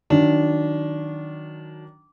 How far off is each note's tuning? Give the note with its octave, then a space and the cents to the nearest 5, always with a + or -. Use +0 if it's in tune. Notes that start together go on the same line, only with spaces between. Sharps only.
D#3 -5 F#3 -10 D4 -20